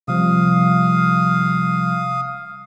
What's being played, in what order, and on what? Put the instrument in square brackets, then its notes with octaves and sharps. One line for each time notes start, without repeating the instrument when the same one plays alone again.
[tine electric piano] C3 F3 G3 [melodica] F5 D#6